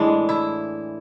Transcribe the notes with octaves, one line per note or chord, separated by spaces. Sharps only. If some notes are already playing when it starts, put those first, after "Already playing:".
Already playing: A2 E3 G#3 D4
E4